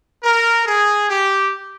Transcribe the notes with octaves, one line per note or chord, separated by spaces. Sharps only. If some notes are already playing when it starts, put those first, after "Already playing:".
A#4
G#4
G4